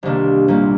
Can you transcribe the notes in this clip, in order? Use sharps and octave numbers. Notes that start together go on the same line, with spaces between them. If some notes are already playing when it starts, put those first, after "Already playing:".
C2 C3 D#3 A#3 D4
C2 A#2 G3 A#3